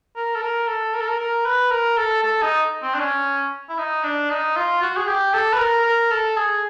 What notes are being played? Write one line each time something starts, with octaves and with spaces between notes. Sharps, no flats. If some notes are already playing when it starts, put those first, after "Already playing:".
A#4
A4
A#4
A4
A#4
A4
A#4
A#4
B4
A#4
A4
A4
D#4
C4
D4
C#4
E4
D#4
D4
D#4
F4
F#4
G#4
G4
A4
B4
A#4
A#4
A4
G#4